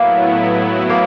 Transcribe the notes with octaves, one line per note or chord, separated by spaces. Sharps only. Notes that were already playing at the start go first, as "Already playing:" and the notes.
Already playing: A2 F#3 A#3 B3 E4
A#3